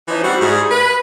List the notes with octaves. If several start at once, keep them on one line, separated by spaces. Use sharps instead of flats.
E3 F3 C#4 D#4
G3 C4 F#4
G#2 G3 E4 G#4
B4